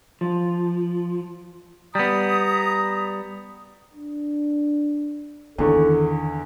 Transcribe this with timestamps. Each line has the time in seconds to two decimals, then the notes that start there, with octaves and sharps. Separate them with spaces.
0.21 F3
1.95 G3 B3 A#5 D#6
3.93 D4
5.58 E2 D3 D#3 A4 C#6